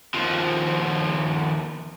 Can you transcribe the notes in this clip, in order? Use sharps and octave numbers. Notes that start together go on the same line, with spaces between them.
D#2 F3